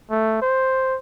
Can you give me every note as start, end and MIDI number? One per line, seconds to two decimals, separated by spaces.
0.10 0.40 57
0.42 0.97 72